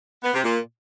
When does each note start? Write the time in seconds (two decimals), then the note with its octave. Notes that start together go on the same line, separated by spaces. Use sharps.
0.23 B3
0.34 C3
0.44 A#2